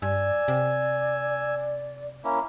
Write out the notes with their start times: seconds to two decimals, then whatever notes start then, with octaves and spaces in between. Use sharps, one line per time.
0.02 G2 D5 G#5 E6
0.48 C3
2.24 A#3 C#4 E4